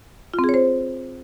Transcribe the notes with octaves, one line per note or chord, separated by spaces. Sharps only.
F4
C4
G#4
C#5
C5